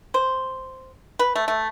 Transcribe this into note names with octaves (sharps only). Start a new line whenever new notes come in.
C5
B4
A3
A3